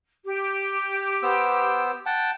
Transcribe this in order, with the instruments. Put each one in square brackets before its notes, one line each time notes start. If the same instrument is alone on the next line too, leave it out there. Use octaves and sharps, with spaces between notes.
[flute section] G4
[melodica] B3 C5 E6
F#5 G5 A5